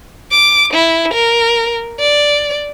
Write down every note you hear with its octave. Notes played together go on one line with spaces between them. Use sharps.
D6
E4
A#4
D5